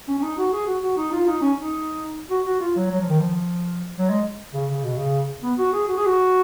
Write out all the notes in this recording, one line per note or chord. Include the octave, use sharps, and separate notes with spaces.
C#4
C#4
D#4
F#4
G#4
F#4
F#4
D#4
F4
D#4
C#4
D#4
F#4
F#4
F4
F#3
F#3
F3
D#3
F3
F#3
G#3
C#3
C#3
B2
C#3
B3
F#4
G#4
F#4
G#4
F#4